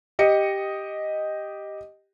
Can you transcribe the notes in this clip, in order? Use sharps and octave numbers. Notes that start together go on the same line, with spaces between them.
G4 D#5 C#7